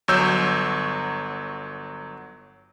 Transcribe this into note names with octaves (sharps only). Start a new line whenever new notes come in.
G1 F#3 C#5 E6 G6